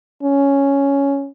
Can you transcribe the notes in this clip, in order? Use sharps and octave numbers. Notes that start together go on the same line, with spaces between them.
C#4